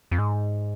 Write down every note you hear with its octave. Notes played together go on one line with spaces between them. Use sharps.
F2
G#2